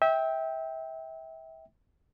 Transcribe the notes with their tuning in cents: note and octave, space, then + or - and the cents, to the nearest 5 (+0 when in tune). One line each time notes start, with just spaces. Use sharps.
E5 -25 G5 +0